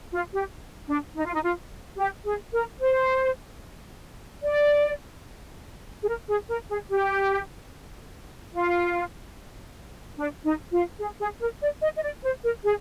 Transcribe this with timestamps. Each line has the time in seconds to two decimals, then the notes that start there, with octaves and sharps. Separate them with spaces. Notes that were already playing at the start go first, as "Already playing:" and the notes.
0.13 F4
0.33 G4
0.88 D4
1.16 D#4
1.25 F4
1.34 D#4
1.43 F4
1.98 G4
2.25 G#4
2.53 A#4
2.80 C5
4.43 D5
6.02 G#4
6.08 A#4
6.28 G#4
6.49 A#4
6.69 G#4
6.90 G4
8.54 F4
10.18 D4
10.45 D#4
10.72 F4
11.00 G#4
11.20 G#4
11.41 A#4
11.61 D5
11.82 D#5
11.97 D#5
12.02 D5
12.23 C5
12.43 A#4
12.64 G#4